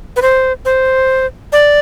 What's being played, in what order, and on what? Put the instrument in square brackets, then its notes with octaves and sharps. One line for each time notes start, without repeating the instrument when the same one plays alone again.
[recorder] B4
C5
C5
D5